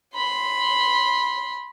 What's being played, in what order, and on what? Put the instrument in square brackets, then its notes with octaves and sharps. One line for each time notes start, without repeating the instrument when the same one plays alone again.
[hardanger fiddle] B5 C6